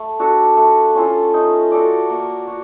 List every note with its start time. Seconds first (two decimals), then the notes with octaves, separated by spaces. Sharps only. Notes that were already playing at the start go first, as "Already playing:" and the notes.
Already playing: A3
0.19 D4 F#4 A4
0.57 A3
0.95 C#4 F4 A4
1.34 D#4
1.72 F#4 A4 D5
2.10 A#3
2.48 F#4